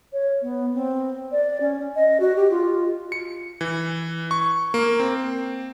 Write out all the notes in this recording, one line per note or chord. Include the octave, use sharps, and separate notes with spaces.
C#5
B3
C4
D5
C#4
D#5
F#4
G4
F4
C#7
E3
C#6
A#3
C4